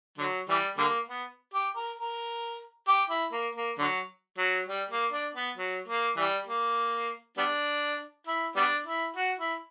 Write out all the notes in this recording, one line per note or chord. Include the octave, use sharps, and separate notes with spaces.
D3 F#3
E3 G3
D3 G3 A#3
B3
G4
A#4
A#4
G4
E4
A#3
A#3
D3 F#3
F#3
G3
A#3
D4
B3
F#3
A#3
E3 G3
A#3
G3 B3 D4
E4
G3 B3 D4
E4
F#4
E4